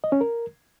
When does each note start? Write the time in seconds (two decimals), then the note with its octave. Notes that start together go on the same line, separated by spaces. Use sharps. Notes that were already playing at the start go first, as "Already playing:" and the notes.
0.04 D#5
0.12 C#4
0.21 A#4